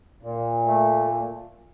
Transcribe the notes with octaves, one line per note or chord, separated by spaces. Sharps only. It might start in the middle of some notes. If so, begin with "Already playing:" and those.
A#2
A3